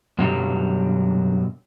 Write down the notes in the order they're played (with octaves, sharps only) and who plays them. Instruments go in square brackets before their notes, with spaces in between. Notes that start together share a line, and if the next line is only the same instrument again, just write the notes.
[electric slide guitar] F#2 B2 D3 F#3 G3